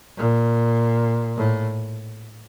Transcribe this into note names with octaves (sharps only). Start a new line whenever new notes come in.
A#2
A2